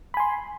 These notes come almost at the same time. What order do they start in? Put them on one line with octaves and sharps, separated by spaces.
B5 G#5 C6